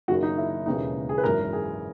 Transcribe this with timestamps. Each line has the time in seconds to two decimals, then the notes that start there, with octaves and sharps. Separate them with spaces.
0.08 F#1 F#2 D#3 F#4
0.23 D#4
0.38 E4
0.66 E1 D#2 C#3 E3 D#4
1.09 G#4
1.18 B4
1.24 G#1 F#2 E3 A#4
1.53 G#4